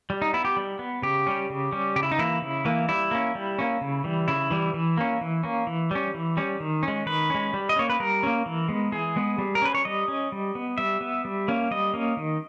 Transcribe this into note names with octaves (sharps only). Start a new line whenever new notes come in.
G3
D#4
B3 E4
G4
G3
B3
C#3 G4
G3 C#4
C#3
G3 C#4
C#3 G4
E4
D#4
E3 A#3 E4
C#3
E3 A#3
G3 E4
A#3 C#4
G3
A#3 C#4
C#3
E3 G3
C#3 E4
E3 G3
E3
A#3 C#4
E3
A#3 C#4
E3
G3 C#4
E3
G3 C#4
D#3
C#4
G#3
D#3 B4
G#3 C#4
G3
D#5
A#3 C#4 C#5
B4
G3 A#4
A#3 C#4
E3
G#3 B3
E3 G#4
G#3 B3
G3
A#4
C#4 B4
C#5
G3 D#5
C#4
G3
B3
G3 E5
B3
G3
A#3 C#4
G3 D#5
A#3 C#4
D#3